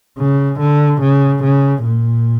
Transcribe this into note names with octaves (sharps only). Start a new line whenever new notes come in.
C#3
D3
C#3
C#3
A#2